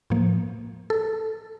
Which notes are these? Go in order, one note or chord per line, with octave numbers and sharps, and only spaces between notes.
A2 F3 A#3
A4